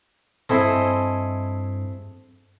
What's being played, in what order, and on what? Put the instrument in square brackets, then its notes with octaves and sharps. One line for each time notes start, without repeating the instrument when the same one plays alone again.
[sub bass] G2 [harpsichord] C4 E4 C5 [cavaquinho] A4 D#5 G#5